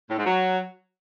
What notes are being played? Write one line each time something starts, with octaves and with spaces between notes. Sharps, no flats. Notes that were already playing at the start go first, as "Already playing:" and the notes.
A2
G#2
F#3